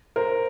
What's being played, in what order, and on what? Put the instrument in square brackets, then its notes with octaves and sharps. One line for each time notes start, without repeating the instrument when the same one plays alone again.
[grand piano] A#4 C5